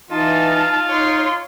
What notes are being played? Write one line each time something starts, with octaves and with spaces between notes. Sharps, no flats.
E3 D#4 F4 A5
D#4 C#5 C6